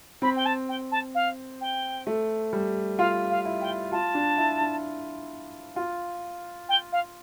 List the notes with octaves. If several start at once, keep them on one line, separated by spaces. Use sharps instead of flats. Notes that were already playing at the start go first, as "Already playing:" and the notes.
C4 B5
G5
A5
G5
A5
F5
G5
A3
G3
F4 F5
F5
E4
G5
F4 A5
D4
E4
D4
F4
G5
F5